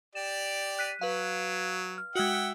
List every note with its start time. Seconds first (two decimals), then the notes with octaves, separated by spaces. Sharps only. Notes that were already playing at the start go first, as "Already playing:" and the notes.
0.15 G4 D5 E7
0.79 F#6 B6 D#7
1.01 F#3 B4 F5
1.98 F6
2.15 G#3 F#4 E5 F#5 G5